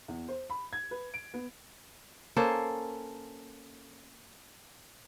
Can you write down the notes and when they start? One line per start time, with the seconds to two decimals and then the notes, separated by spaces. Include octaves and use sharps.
0.08 E2
0.28 C5
0.50 B5
0.73 G#6
0.91 B4
1.14 D7
1.34 B3
2.37 A#3 C#4 A4 C5